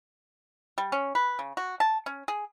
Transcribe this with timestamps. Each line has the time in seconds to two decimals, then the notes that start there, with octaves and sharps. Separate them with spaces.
0.78 G3
0.92 C#4
1.15 B4
1.39 C#3
1.57 F#4
1.80 A5
2.06 C#4
2.28 G#4